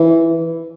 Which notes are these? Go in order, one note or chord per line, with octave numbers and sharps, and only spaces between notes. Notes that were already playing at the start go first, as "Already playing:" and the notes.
Already playing: E3